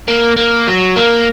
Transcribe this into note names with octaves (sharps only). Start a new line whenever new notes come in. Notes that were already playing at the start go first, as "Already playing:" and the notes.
A#3
A#3
F#3
A#3